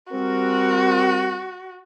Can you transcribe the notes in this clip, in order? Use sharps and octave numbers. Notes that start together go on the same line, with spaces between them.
G3 C4 F#4 A#4